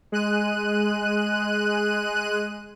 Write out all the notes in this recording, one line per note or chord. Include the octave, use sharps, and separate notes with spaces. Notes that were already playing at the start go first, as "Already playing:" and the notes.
G#3 F#6 D#7